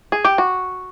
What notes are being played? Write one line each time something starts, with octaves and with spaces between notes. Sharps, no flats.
G#4
G4
F#4